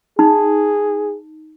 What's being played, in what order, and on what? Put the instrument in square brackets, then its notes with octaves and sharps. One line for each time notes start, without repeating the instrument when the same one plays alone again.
[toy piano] D#4 [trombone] G#4